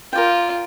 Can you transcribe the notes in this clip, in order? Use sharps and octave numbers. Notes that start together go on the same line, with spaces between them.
F4 A#4 D5 G5